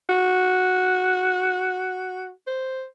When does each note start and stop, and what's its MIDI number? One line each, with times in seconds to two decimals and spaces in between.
0.09 2.30 66
2.47 2.85 72